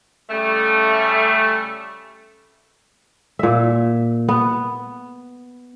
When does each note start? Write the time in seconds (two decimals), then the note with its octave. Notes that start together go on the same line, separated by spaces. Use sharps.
0.30 C#3 G3 A3
3.39 A#2 E5
4.29 B3